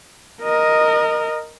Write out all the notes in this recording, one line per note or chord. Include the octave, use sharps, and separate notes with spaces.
A#4 D#5